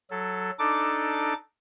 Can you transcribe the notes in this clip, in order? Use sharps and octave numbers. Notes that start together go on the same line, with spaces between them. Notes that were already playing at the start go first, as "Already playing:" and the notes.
F#3 A4
D4 D#4 A4 D6